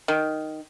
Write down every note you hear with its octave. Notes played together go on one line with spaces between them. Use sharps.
D#3